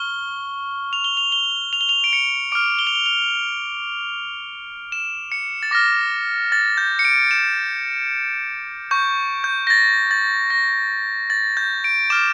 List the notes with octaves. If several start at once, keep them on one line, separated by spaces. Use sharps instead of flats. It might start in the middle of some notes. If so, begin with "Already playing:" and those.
Already playing: C#6 F6 G7
F7
G7
F7
G7
F7
G7
F7
D7
C#7
D6 F6 D7
G7
F7
G7
F7
E7
C#7
A6
D6 F6 A#6
A6
G6
C#7
D7
E7
C#6 G6
G6
A#6
A6
A6
A#6
A6
G6
D7
D6 F6 E7